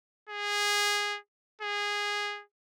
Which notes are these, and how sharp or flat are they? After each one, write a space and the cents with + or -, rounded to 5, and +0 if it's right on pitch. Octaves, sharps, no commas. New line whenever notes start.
G#4 -15
G#4 -15